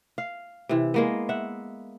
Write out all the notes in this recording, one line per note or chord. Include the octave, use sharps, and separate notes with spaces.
F5
C3 E3
G#3 A#3 B3
E5 F#5